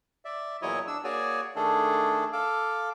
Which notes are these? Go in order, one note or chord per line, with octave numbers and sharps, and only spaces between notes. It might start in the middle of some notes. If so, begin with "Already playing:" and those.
D5 E5
E2 A#2 F#3 E4 C#5 D#5
D4 E6
A#3 F#4 G#4 C#5 D5 G#5
D#3 A3 D4 G#4 A4
A4 F5 D6